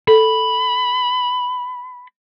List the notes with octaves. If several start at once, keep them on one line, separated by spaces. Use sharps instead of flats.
A4 B5